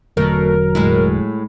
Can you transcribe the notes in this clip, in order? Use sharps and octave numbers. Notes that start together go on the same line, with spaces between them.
E1 B2 D3 F#3 A3 A#4
A2 G#3 E4